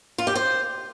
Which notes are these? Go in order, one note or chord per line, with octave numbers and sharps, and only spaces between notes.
F4
G4
C5